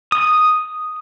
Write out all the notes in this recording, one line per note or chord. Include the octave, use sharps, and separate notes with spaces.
D#6